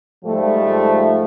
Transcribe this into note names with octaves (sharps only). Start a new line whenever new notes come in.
G#2 F3 G3 A3